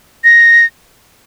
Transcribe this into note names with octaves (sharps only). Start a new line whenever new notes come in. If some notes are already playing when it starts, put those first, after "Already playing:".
A#6